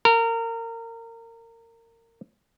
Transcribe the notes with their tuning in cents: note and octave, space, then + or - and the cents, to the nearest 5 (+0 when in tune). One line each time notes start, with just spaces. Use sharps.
A#4 -25